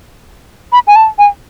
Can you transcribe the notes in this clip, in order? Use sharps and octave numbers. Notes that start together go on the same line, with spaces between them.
B5
G#5
A5
G#5